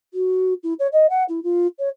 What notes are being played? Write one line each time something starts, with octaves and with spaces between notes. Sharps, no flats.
F#4
E4
C#5
D#5
F#5
E4
F4
C#5